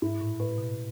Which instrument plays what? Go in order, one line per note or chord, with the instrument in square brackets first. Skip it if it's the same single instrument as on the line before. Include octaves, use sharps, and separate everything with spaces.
[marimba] G#2 [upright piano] E4
[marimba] A2
[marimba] A2 [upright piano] B4
[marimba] B2